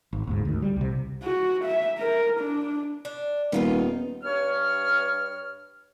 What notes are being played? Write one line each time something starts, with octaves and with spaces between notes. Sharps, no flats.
G#1
G1 D2 G#2
D2 D#3
G3
C2 C3
F#4
E5
A#4
D4
D4
D#1 D#3 B3 D#4 F4
G2 C#5 F6